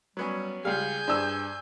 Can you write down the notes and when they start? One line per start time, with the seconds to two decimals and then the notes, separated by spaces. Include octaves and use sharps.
0.17 F#3 G3 B3 C#4
0.65 C#2 G3 G#4 F5 G#5 G6
1.07 G2 C5 E6